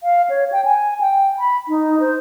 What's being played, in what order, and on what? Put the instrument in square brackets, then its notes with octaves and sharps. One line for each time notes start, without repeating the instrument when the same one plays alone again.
[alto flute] F5
C#5
G5
G#5
G5
B5
D#4
C5